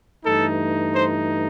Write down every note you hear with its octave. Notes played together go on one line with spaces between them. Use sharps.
G2 E3 A3 D#4 A4
C5